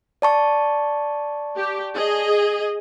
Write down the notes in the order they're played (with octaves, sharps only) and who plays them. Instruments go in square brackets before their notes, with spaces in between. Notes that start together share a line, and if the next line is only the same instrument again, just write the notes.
[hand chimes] D5 A5 C#6
[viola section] G4
G#4 D#5